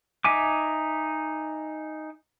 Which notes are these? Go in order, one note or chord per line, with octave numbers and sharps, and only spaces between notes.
D#4 E5 G#5 D6